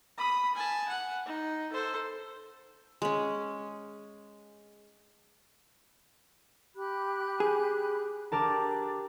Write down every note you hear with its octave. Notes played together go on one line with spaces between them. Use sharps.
B5 D#6
G#5 A5
F#5
D#4
A4 C5
G#3 C#4
G4 B5 F#6
G#4
D4 G4 A4 A#4 A5